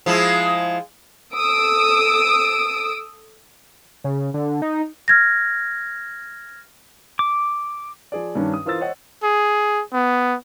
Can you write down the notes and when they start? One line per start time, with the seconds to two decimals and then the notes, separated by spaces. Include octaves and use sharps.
0.06 F3 G#3 E4
1.35 A4 D#6 E6 D7
4.04 C#3
4.34 D3
4.62 D#4
5.08 F6 G#6 A#6
7.19 D6
8.12 F3 G#4 D5
8.35 G2 D#3 C#4 D4
8.54 D#6
8.66 E3 F4 A#4 C5 E6 A6
8.80 C5 C#5 D#5 F#5 A6
9.24 G#4
9.93 B3